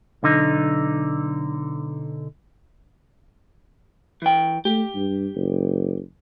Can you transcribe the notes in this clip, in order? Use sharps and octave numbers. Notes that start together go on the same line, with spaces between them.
B1 D3 D#4
E3 G5
A3 G4
G2
F#1